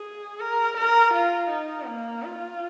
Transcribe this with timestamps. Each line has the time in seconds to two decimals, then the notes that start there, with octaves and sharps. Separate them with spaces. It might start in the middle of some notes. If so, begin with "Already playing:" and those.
Already playing: G#4
0.40 A#4
0.77 A#4
1.14 F4
1.50 D#4
1.86 A#3
2.23 F4